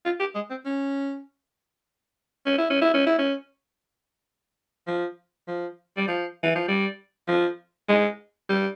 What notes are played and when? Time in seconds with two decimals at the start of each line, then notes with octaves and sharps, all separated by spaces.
0.05 F4
0.20 G4
0.35 G#3
0.50 C4
0.65 C#4
2.46 C#4
2.58 E4
2.70 C#4
2.82 E4
2.94 C#4
3.06 E4
3.19 C#4
4.87 F3
5.48 F3
5.97 G3
6.08 F3
6.43 E3
6.55 F3
6.68 G3
7.28 F3
7.89 G#3
8.49 G3